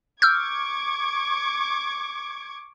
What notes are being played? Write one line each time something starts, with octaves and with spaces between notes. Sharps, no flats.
C#6 D6 E6 F6 G6 G#6